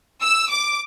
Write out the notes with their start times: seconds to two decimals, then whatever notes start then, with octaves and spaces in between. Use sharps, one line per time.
0.21 E6
0.50 D6